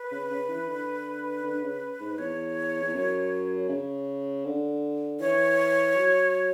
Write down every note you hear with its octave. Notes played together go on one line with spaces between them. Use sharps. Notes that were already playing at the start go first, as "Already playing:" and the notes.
Already playing: B4
C#3
C#3
E3
D3
D3
C#3
G#2
E2 C#5
E2
F#2
C#3
D3
E3 C#5
F#3